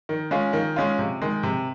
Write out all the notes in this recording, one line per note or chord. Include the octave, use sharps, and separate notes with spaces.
D#3
G#3 C#4 F4
D#3
G#3 C#4 F4
C3
D#3 G#3
C3